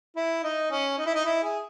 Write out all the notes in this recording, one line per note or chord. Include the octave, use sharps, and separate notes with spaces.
E4
D#4
C#4
D#4
E4
D#4
E4
G#4